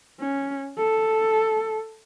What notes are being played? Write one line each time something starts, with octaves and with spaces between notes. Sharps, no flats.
C#4
A4